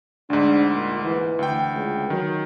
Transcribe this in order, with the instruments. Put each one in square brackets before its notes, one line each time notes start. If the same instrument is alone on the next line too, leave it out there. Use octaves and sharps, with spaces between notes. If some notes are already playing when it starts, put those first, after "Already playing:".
[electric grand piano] D2 G#2 [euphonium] D4
[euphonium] A#2
E3
[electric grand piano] D2 G5
[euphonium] C#2
[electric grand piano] D#3 [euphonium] F#3